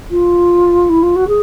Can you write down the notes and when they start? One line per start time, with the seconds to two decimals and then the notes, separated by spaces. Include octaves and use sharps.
0.10 F4
0.89 E4
1.02 F4
1.15 F#4
1.28 G#4